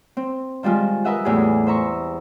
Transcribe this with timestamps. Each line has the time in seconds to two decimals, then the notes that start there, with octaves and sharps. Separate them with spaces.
0.17 C4
0.63 D#3 F3 G3 G#3 F4
1.05 A#4 B4 D#5 E5 F#5
1.25 E2 A2 G4 G#4
1.67 C5 E5 A#5 C#6